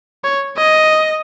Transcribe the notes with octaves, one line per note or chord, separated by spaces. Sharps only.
C#5
D#5